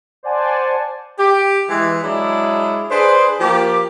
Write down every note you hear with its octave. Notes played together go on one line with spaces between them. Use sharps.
C5 D5 F#5 G#5 A5
G4
E3 G#3
F#3 G#3 D4 E4 G#4
D4 G#4 B4 C5
F3 A#3 G4